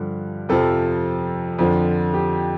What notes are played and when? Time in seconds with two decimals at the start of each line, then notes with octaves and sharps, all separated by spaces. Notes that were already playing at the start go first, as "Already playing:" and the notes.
Already playing: G2 D3 F3
0.49 F2 C3 F3 A4
1.59 F2 D3 F3
2.14 G4